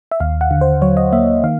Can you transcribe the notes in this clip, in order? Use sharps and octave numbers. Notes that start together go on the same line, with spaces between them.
E5
D#2 F5
F#5
D3
C5
F#3 C#5
D#5
A#3 E5
D#3 F5